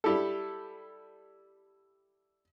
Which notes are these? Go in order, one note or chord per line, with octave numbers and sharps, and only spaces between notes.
G3 E4 G4 A4